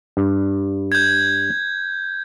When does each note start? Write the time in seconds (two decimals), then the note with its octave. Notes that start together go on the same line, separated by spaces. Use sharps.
0.17 G2
0.92 G6 G#6